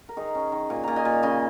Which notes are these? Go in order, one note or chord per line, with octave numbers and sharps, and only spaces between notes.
A#4
D#3 D#4 G#4
C#4
D#3
A#2 G#5
A#2 A#5
D#5 G#5
A#2
C#3 D#5 G#5